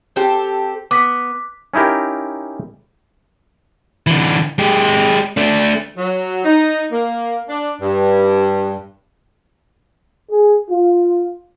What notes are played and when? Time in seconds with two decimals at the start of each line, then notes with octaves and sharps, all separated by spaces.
0.16 C4 G4 A4
0.91 B3 D6 B6
1.74 C#4 D#4 E4 G4 A#4
4.07 D3 E3
4.58 G#3 G4
5.37 A3 D4
5.98 F#3
6.45 D#4
6.92 A#3
7.49 D4
7.81 G2
10.30 G#4
10.69 F4